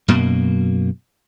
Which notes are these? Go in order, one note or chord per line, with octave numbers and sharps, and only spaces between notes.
F#2 B2 A#3